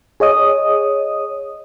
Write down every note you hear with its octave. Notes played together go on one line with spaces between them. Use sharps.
G#4 C#5 D#5 D#6